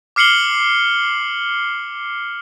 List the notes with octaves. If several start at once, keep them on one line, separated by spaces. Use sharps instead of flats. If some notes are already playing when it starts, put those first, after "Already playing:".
D6 F6 C7 C#7 F#7 G7